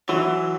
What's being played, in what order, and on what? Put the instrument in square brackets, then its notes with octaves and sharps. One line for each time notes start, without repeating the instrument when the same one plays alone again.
[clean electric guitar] E3 [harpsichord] F#3